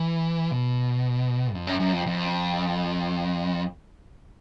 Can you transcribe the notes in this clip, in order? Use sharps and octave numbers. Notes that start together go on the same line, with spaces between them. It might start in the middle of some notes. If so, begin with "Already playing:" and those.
Already playing: E3
B2
F2
F#2
F#2
F2
F2